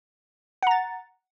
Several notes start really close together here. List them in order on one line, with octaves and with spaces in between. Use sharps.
F#5 A#5 A6